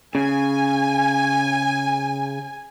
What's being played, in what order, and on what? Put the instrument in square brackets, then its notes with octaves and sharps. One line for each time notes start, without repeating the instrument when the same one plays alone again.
[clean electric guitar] C#3 [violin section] G#5